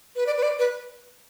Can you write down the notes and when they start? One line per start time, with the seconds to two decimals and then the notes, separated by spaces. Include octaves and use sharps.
0.16 B4
0.27 D5
0.37 B4
0.43 D5
0.59 B4